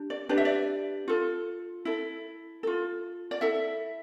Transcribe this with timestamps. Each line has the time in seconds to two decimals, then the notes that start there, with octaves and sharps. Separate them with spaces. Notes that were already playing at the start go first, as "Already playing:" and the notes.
Already playing: D4 G4
0.10 D5
0.29 D4 G4 B4 D5
0.37 E5
0.45 D5
1.08 F4 A4
1.85 E4 A4
2.63 F4 A4
3.31 D5
3.41 E4 A4 E5